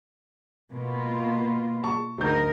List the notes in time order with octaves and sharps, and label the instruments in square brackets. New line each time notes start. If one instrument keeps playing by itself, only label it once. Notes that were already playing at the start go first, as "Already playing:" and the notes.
[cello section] B2 A#3 F4
[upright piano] A5 C#6
[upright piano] D2 G6 [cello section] D#4 A#4